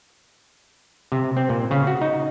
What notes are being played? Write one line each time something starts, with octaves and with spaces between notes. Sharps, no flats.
C3
C4
A#2
C#3
F#4
D#4